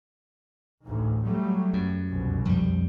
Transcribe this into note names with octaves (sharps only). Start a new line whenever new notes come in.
A1 D2 G#2
F#3 G3 A3
F#2
F1 C2 B2
F2 G3